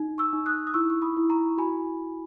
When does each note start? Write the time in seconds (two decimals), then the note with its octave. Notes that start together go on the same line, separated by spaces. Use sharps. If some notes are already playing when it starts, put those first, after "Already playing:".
Already playing: D#4
0.18 C#6 E6
0.33 D#4
0.46 D#6 F#6
0.67 D#6
0.74 E4 C#6 E6
0.90 C#6
1.02 B5 D#6
1.17 E4
1.30 A#5 C#6
1.58 F#4 G#5 B5